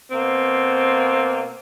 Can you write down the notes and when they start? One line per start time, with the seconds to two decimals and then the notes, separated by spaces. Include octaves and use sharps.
0.11 B2 A#3 C4